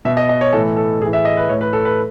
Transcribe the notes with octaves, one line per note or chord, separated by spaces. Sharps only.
B2 E5
D#5
D#5
C#5
A2 E3 A4
A4
A2 G#4
E3
E5
D#5
B4
A2 E3 C#5
B4
A4
B4